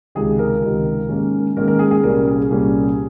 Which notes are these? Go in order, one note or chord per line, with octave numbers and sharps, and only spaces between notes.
C#2 C3 D#3 G#4
A#4
C#2 C3 D#3
G#2 D#3 A#3 C#4
G#2 D#3 A#3 C#4 A#4
A#4
G#4
G#4
C2 A#2 G3 A#3 C#4 A#4
G#4
C2 A#2 G3 A#3 C#4